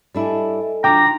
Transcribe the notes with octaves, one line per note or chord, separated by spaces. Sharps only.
G3 D4 E4 A4 D#5 G#5
F#3 D4 F4 F#4 G5 A#5 D6
D#4 C6